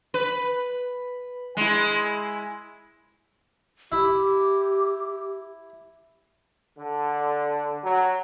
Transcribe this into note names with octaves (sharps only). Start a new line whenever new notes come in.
B4
G#3 E4
E4 G4
D3
F#3